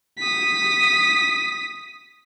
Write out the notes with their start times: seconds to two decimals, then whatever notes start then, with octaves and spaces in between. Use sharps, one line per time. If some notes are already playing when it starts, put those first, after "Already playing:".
0.19 D#6 B6